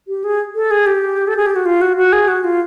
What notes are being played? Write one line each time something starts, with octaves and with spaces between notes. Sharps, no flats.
G4
G#4
A4
G#4
G4
A4
G#4
G4
F#4
F4
F#4
F#4
G#4
F#4
F4